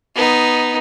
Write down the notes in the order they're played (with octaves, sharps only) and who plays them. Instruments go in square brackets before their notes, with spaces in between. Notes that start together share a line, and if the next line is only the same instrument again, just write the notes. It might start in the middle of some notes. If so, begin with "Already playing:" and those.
[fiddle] B3 D#4